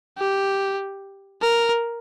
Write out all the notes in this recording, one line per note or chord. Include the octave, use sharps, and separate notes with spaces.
G4
A#4